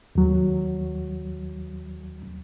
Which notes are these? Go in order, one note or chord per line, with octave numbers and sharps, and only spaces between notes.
D#2 F#3